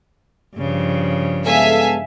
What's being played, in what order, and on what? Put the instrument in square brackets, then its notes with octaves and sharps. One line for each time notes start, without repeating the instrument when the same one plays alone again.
[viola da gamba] G2 C#3 F3
[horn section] G#3 B3 A4 [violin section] E5 F5 G#5